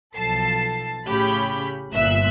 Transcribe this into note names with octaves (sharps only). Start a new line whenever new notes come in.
B1 F3 A4 A5 C7
A2 C#3 C#4 G4 B5 G6
G1 A#2 E5 F#6